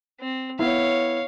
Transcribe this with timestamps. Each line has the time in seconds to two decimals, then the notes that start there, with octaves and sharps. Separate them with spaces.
0.20 C4
0.59 B3 E4 C#5 F5